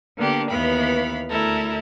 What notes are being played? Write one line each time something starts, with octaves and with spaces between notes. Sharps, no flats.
D3 A#3 B3 D4 G4
D#2 E3 B3 F5 B5
D2 E4 A4 A#4